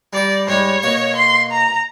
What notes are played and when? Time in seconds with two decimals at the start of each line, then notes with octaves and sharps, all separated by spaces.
0.13 G3 D5 A#5
0.48 G#2 G3 G#3 C#5
0.83 B2 A#3 C#6
1.16 C6
1.51 A#5